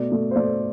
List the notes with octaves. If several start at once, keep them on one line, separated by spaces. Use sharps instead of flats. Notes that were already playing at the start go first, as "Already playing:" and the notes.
Already playing: B2 A3 D5
A3
C5
A3 D5